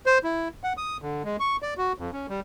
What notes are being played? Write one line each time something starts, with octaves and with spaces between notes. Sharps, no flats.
C5
E4
F#5
D#6
D3
G#3
C#6
D5
F#4
F2
C#4
G3